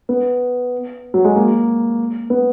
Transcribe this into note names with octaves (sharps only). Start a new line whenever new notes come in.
B3
F#3
G#3
A#3
B3